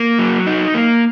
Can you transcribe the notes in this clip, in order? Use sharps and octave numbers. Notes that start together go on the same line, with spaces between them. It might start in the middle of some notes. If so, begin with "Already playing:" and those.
Already playing: A#3
F#3
D#4
A#3